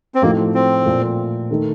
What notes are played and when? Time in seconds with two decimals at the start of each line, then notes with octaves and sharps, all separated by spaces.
0.15 C4
0.22 A2 F3 A3 A#3 D#4 F#4
0.54 C4
0.85 A#2 F3 A3
1.51 D#3 A3 D#4